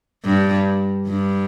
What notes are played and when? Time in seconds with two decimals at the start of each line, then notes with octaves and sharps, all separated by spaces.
0.24 G2
1.08 G2